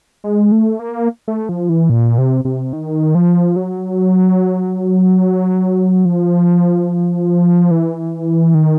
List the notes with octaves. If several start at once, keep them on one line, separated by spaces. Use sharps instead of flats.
G#3
A3
A#3
A3
F3
E3
A#2
C3
C3
D#3
F3
F#3
F3
E3
D#3